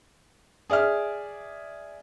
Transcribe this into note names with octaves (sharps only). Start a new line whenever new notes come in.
G#4 D5 E5 F6